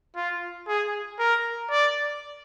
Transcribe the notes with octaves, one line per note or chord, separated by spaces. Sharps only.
F4
G#4
A#4
D5